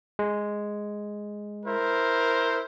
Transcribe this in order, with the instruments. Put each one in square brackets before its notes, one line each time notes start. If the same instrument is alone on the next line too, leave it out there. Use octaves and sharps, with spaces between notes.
[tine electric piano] G#3
[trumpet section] E4 A#4 C5